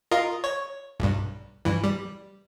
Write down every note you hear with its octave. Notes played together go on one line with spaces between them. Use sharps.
F4 A#4 D#5
C#5
B1 G2
G2 E3
G3